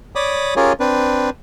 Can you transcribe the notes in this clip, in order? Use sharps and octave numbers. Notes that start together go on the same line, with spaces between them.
C#5 D5 B5 D6 D#6
C#4 F4 G4 G#4 A#4 C#5
C4 D4 B4